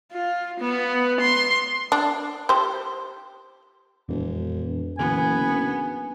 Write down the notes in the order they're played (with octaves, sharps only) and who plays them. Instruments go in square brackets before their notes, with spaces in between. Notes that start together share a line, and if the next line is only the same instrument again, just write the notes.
[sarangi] F4
B3
C6
[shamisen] D4
G4 C5
[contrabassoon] E1 [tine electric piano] F2 A#2 E3
[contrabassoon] F#1 [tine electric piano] A#2 D3 E3 [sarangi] B3 [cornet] G#5
[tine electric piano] D4